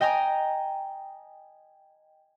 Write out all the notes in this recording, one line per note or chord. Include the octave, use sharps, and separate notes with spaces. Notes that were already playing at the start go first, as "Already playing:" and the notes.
D#5 G5 G#5 A#5 D#6